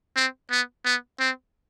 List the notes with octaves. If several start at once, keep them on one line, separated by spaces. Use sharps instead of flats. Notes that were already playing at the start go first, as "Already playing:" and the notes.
C4
B3
B3
C4